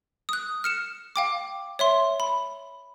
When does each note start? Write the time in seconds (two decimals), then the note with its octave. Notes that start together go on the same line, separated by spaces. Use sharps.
0.29 D#6 F#6
0.64 F6 C#7 E7
1.16 F5 G5 D6
1.79 C#5 E5 C6
2.20 B5